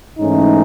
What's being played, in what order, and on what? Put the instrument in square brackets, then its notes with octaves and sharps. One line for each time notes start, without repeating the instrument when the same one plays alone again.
[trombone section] G#2 E3 A3 C#4 D#4